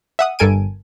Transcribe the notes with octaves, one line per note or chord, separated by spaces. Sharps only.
E5 F#5 D#6
G1 A4 A#4 G#5 D7 D#7